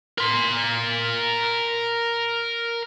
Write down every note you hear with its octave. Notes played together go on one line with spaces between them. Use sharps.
A#4 C6